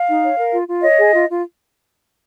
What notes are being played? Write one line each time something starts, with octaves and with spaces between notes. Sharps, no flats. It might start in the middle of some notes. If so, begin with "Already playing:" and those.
Already playing: F5
D#4
C#5
A#4
F4
F4
C#5 D#5
G#4
F4
F4